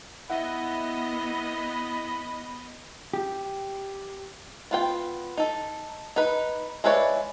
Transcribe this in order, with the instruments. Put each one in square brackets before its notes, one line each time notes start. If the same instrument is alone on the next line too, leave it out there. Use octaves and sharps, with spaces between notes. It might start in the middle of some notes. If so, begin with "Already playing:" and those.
[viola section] B3 D#5 [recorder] E4 [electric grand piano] E5 F#5 [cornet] B5
[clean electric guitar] G4
[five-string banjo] B3 F4 G5
D#4 A4
D#4 B4
G#3 E4 B4 C#5 D5